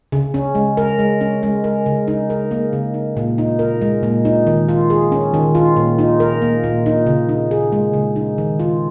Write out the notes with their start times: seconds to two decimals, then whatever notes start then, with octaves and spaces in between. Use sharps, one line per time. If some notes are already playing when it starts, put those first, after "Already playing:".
0.12 C#3
0.34 C#4
0.55 G#3
0.77 A#4
0.99 G#3
1.21 C#4
1.43 G#3
1.64 A#4
1.86 C#3
2.08 D#4
2.30 A#4
2.51 A#3
2.73 C#3
2.94 D#4
3.17 A#2
3.38 D#4
3.59 A#4
3.81 G#3
4.03 A#2
4.25 D#4
4.47 D#3
4.68 F4
4.90 G#4
5.12 C#4
5.34 D#3
5.55 F4
5.76 A#2
5.98 D#4
6.20 A#4
6.42 A#3
6.64 A#2
6.86 D#4
7.07 C#3
7.29 D#4
7.51 G#4
7.72 G#3
7.93 C#3
8.16 D#4
8.38 D#3
8.59 F4